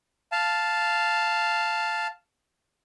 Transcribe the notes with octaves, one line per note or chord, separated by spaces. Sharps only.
F5 A5